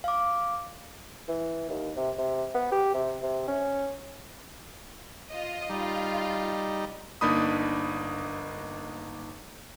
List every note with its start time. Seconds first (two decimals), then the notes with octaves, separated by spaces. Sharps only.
0.04 F5 D6
1.28 E3
1.69 D#2
1.97 C3
2.18 C3
2.55 B3
2.72 G4
2.94 C3
3.23 C3
3.48 C#4
5.31 F4 D#5
5.69 G3 D#4 F4
7.21 G1 A#3 D4 D#4 B5 D#6